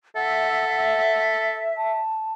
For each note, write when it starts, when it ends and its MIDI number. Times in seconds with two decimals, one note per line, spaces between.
0.16 1.73 69
0.16 1.99 76
0.16 1.21 78
1.77 2.34 81